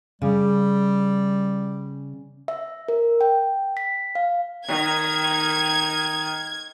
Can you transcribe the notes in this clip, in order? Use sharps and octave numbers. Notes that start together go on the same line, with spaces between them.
C#3 G3
E5
A#4
G5
B6
F5
D#3 G#6